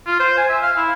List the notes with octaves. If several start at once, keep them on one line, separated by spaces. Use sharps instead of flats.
F4
C5
G#5
E5
F5
E4